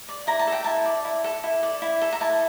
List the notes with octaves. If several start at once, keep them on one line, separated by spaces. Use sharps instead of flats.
D5
E4 A#5
A5
A4
G5
E4 A5
D5
E4
A4
E4
D5
E4
A4
A#5
E4 A5